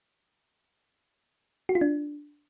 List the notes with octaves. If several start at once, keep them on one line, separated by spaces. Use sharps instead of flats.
F#4
F4
D4